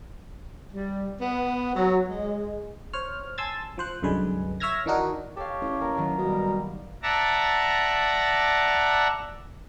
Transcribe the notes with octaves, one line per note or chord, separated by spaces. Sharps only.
G3
B3
F#3
G#3
C5 C#5 F6
G#5 A5 C6 E6 G#6 A6
F3 C5 F#6
C2 F#2 D3 G#3 B4 G#5
C#5 E5 E6 F6 G#6 A#6
D#3 E3 D4 D#4 F#4 A#4
G4 A4 C#5 F5
A1
A#3 A#4
D#3 F#3
B2 G3
D5 E5 F#5 A5 A#5